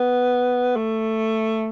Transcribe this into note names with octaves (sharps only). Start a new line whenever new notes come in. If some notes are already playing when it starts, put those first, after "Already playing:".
Already playing: B3
A3